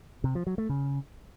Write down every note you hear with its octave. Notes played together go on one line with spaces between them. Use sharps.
C3
F3
F#3
A3
C#3